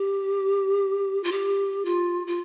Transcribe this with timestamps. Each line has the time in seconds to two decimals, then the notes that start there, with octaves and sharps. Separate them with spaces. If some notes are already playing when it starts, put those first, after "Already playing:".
Already playing: G4
1.24 F4
1.32 G4
1.85 F4
2.27 F4